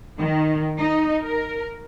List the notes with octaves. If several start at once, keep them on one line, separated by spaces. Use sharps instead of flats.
D#3
D#4
A#4